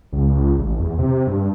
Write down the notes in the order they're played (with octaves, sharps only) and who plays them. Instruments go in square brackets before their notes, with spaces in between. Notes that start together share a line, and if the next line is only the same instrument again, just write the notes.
[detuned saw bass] C#2
C#2
A1
E2
C3
G2